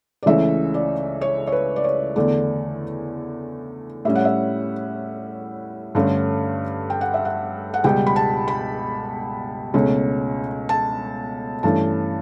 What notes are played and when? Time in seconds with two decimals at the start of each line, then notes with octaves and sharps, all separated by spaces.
0.23 D5
0.26 C#2 C#3 E3 A3 C#4 E5
0.74 D5
1.21 C#5
1.47 C#5
1.52 B4
1.76 D5
1.84 C#5
2.16 E2 D3 A3 D5
4.05 A2 G3 C#4 E5
4.15 F#5
4.25 E5
5.95 G2 D3 A3 C#4
6.90 G5
7.01 F#5
7.14 E5
7.25 F#5
7.74 F#5
7.84 C#2 B2 G3 B3 G5
8.07 B5
8.16 A5
8.48 B5
9.74 C#2 B2 A3 C#4
10.69 A5
11.63 G2 E3 A3 C#4 A5